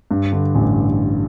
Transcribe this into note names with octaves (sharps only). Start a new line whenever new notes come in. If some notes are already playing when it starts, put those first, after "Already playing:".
G2
D3
A1